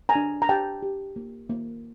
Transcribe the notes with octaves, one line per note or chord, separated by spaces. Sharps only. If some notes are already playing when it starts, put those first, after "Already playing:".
G#5 A#5
D4
A#5
G4 G5 A5
G4
A#3
A#3